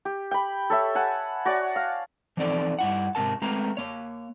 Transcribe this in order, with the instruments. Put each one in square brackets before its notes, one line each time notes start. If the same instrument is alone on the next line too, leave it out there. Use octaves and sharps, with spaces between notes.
[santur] G4
G5 B5
A4 C#5 E5
F#5 G#5 A5
F#4 C#5 D5
F5
[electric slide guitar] E3 F3 C4 D#4 A4 D5
G2 E4 F#5
G#2 C3 A#4 A5
G#3 A3 C4 B4 A#5
A#3 C#5